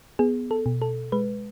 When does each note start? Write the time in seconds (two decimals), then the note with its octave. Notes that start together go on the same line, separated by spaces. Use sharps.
0.19 B3 G#4
0.51 A4
0.66 B2
0.82 A4
1.12 G#3 B4